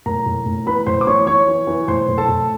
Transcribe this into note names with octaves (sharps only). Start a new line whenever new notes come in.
A2 A#4 A#5
A2
A2
E3 B4 B5
A2 C5 C6
D6
E3 C#5 C#6
E3 C#5 C#6
E3
E3
A2 C5 C6
A2
A4 A5
A2